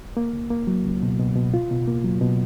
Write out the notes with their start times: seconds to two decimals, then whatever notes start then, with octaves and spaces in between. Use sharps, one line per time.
0.17 A#3
0.33 C#2
0.50 A#3
0.67 F#3
0.85 C#2
1.03 B2
1.20 B2
1.36 B2
1.54 F4
1.71 B2
1.88 A#3
2.04 F#3
2.21 B2